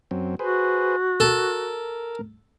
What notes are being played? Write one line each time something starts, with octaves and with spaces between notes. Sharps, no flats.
F#2 F#3 C4
F#4 G#4 B4 C5
A4 A#4